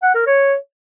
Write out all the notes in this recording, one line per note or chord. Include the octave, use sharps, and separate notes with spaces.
F#5
A#4
C#5